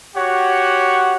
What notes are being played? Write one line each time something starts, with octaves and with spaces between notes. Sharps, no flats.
F#4 G4 C#5 F#5